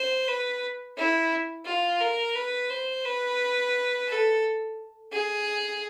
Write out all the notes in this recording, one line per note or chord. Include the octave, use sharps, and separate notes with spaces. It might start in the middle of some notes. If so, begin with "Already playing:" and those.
Already playing: C5
B4
E4
F4
A#4
B4
C5
B4
A4
G#4